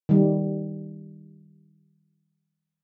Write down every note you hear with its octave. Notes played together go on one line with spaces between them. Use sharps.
D#3 G3